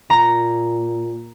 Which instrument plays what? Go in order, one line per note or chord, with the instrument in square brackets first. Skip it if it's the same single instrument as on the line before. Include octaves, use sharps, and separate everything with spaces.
[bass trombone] A#2 [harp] A#5